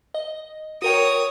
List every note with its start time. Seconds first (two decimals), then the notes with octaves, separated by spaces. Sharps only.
0.14 D#5
0.82 F#4 A#4 C#5 G5 D#6